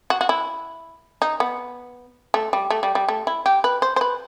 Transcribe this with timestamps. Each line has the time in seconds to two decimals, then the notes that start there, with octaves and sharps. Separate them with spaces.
0.10 F#4
0.21 F#4
0.29 E4
1.22 D#4
1.40 B3
2.34 A3
2.53 G3
2.70 A3
2.83 G3
2.95 G3
3.09 A3
3.27 E4
3.46 G4
3.64 B4
3.82 C5
3.96 C5
4.01 B4